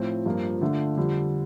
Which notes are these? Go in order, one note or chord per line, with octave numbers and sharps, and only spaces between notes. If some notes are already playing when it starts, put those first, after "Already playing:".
Already playing: A2 F3 C4
G2 F3 A#3
D3 A3 D4 F4
F2 D3 G3